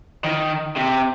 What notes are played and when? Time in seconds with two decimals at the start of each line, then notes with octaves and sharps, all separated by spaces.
0.24 D#3
0.76 C3